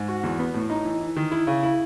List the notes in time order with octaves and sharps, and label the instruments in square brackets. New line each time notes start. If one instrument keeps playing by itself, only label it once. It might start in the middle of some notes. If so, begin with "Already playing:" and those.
Already playing: [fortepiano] G#2
F#4
E2
B3
A2
D#4
E3
E3
D#3
E4
C#3
E4